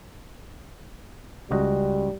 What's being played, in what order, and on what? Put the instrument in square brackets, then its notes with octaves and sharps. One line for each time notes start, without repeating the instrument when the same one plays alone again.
[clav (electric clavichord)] C#2 F#4 D#5 [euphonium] G3